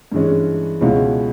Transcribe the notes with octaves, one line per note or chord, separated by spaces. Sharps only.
G2 E3 G#3 C#4
C#2 B2 G#3 C#4 E4